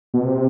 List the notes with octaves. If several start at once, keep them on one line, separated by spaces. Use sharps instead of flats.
B2
C3